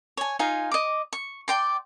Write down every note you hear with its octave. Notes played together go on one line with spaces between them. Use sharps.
C#5 G#5
D#4 F4 F5 G#5
D#5 D6
C#6
D5 G5 C6